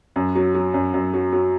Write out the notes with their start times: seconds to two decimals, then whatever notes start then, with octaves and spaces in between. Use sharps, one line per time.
0.16 F#2
0.35 F#3
0.55 F#3
0.74 F#2
0.94 F#2
1.13 F#3
1.32 F#3